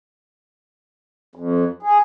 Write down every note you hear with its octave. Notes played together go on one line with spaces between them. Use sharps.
F2
G#4